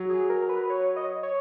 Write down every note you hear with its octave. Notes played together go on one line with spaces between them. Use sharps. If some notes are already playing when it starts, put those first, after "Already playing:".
Already playing: F#3
G#4
A#4
B4
C#5
D#5
C#5